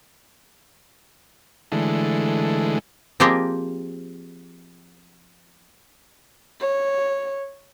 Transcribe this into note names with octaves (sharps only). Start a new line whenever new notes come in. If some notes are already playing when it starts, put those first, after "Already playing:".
D3 E3 G#3 A3
F3 A#3 C4 G4 G#4 D#5
C#5